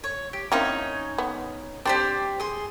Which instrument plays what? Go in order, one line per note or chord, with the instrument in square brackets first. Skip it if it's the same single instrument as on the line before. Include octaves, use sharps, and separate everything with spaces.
[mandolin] C#5
G4
[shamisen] A#3 C4 E4 [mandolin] C#4 D#4 C#5
[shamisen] B3
[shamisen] G3 C4 D4 [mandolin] G4 C5 D5
[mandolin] G#4 C6